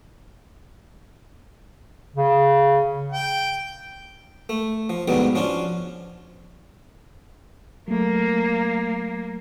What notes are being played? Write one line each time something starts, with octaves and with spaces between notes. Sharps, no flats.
C#3
G5
A3
F3
D2 G#2 B2 F#3 G3 B3
F3 C#4 D4 F4
F#3 A3 A#3